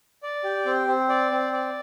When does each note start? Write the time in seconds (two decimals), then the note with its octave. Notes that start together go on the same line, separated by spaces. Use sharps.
0.23 D5
0.44 G4
0.66 C4
0.87 C4
1.09 D5
1.31 C4
1.53 D5